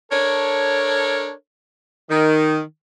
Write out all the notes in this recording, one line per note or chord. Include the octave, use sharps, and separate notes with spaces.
D4 A4 A#4 C#5
D#3